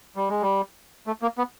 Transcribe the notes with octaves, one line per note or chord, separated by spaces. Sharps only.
G3
G#3
G3
A3
A#3
B3